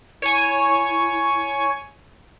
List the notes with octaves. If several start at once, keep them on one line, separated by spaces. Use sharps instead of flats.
E4 C#5 G#5